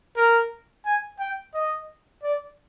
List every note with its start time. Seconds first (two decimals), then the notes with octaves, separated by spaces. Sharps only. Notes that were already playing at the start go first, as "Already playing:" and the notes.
0.17 A#4
0.85 G#5
1.19 G5
1.54 D#5
2.23 D5